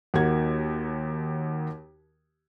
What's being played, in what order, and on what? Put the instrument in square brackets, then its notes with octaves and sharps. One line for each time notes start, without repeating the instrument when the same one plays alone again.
[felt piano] D#2 A#3 D#4 F#4 G#6